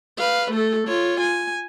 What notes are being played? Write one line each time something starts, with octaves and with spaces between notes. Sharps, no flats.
B4 F5
A3 A4
F4 C#5
G#5